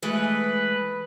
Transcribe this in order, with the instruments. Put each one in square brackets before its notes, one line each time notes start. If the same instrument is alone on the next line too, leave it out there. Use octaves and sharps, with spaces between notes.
[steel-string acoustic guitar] E3 G#3 A3 [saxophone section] B4